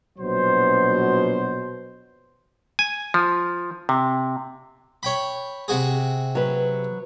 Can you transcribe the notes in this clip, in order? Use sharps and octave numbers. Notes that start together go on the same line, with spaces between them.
A#1 B2 F#3 C5
G#5
F3
C3
C#5 G5 B5
C3 F#4 G#4
F#3 B4